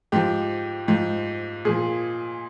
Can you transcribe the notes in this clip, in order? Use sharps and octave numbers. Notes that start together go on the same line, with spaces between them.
G#2 F3 G4
G#2 F3
A#2 F3 G#4